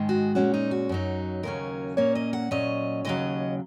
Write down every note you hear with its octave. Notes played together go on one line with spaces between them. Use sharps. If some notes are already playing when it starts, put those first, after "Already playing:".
Already playing: G#2 D#3 G#3
F#4
A#2 G#3 C#4 F#4
D#4
F#4
F#2 F#3 D#4
D#2 C#3 F#3 C#4 A#4
A#2 A#3 C#4 C#5
D#5
F#5
A#2 F#3 C#4 D#5
D#2 C#3 F#3 D#5